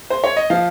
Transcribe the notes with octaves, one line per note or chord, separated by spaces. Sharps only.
C5
C#5
D#5
F3 F5